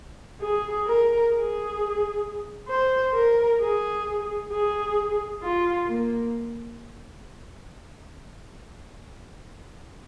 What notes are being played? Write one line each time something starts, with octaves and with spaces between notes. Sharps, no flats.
G#4
A#4
G#4
C5
A#4
G#4
G#4
F4
A#3